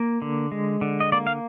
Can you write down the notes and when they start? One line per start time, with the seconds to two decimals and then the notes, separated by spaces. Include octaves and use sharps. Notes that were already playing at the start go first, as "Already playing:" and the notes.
Already playing: A#3
0.22 D3
0.52 G#3
0.81 D3
1.00 D#5
1.12 A#3 D5
1.27 F5